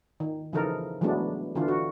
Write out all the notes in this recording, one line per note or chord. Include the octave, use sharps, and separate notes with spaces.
D#3
C#3 E3 F3 D#4 A4 A#4
E3 F#3 G#3 A3 B3 D4
D3 E3 D4 F4
F#4